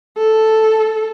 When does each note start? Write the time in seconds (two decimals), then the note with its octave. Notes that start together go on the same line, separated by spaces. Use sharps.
0.17 A4